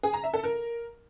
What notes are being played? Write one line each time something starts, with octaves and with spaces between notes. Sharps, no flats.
G#4
A#5
E5
A4
A#4